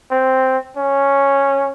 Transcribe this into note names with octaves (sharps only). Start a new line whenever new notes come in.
C4
C#4